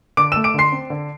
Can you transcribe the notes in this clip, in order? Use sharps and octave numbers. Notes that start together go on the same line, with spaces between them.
D3 D6 D7
E6 E7
A3
D6 D7
D3 C6 C7
C4
D3